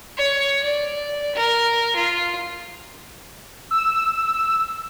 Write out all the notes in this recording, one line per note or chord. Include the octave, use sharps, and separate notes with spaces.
C#5
D5
A#4
F4
E6